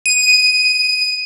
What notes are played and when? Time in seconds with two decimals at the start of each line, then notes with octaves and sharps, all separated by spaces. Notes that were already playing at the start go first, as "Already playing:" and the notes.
0.06 D#7